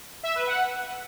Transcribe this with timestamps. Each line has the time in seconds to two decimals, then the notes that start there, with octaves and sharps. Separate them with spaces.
0.23 E5
0.35 B4
0.47 F#5